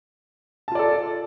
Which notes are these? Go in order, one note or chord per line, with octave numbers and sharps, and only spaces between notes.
F4 A4 D5 A5